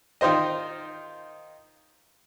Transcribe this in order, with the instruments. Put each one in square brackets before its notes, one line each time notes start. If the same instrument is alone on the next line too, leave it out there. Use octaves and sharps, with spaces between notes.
[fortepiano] D#3 D#4 F4 C5 D#5